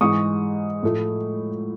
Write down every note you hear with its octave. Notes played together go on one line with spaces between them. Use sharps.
G#2 E3 G#3 C#6 D#6
A2 F3 A3